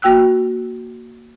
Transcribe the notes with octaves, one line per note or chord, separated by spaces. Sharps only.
A#3 F#4 G5 E6 F#6